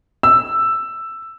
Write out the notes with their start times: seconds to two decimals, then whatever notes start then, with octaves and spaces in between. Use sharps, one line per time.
0.23 E6